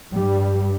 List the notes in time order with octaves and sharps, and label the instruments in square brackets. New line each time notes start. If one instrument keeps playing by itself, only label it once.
[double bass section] G2 G3